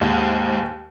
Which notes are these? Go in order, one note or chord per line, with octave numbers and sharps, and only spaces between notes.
D#2 G#2